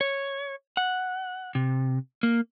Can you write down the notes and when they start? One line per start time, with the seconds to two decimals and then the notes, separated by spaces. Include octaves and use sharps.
0.01 C#5
0.77 F#5
1.55 C3
2.23 A#3